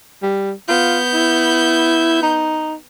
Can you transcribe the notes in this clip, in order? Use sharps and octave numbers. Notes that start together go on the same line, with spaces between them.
G3
B3 F4 G6
E4
D#4